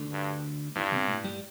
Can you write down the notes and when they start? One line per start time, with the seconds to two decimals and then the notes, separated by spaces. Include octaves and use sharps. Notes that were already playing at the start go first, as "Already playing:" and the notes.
Already playing: D2 D3
0.12 G2
0.76 E2 G2 E3
0.92 C2 C3
1.09 A2
1.24 G2 G3